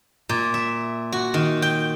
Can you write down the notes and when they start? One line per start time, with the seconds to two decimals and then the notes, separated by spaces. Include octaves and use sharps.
0.29 A#2
0.54 E5
1.12 F#4
1.34 D#3
1.62 G5